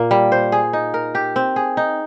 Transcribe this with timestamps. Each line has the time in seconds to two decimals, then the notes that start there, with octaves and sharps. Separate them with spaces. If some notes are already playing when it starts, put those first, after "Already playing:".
Already playing: A#2 A#3
0.11 G3
0.32 C5
0.52 G#4
0.73 D#4
0.94 A#4
1.15 G4
1.36 C4
1.56 G#4
1.77 D#4